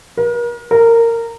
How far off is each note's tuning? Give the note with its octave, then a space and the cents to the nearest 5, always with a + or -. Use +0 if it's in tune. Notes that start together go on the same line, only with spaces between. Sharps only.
A#4 +40
A#4 -15